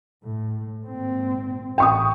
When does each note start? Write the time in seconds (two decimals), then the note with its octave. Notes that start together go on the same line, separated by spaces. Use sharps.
0.23 A2
0.85 G#1 A#2 C4
1.78 A1 G5 C#6 D#6